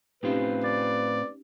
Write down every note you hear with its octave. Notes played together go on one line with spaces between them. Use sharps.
A2 C4 C#4 D#4 F4 G4 B4
D5 A6